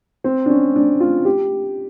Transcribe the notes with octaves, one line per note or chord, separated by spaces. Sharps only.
C4
D4
C#4
D4
F4
G4